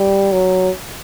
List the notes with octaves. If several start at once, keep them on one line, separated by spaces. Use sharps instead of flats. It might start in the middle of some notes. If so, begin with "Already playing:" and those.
Already playing: G3
F#3